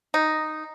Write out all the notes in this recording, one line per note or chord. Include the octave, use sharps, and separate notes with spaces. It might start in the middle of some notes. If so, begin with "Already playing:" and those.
D#4